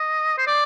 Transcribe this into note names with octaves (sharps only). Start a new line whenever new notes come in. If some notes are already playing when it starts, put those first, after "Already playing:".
Already playing: D#5
C5
D5